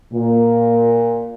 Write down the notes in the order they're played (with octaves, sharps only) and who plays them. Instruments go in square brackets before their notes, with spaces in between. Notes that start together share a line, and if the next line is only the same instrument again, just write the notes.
[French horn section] A#2